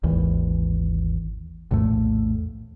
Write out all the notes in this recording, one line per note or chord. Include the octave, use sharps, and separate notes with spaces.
G#1 D#2 E3
A#1 E2 A2 A3